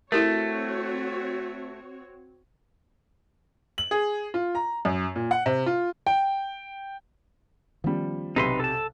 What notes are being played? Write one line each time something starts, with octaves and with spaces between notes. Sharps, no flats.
A3 C4 E4 F#4 G4 A#4 C#5
F#7
G#4
F4
A#5
F#2
A#2
F#5
C3
F4
G5
D#3 F3 G3 B3 C#4
B1 C3 D#4 B4 C6
A4 A5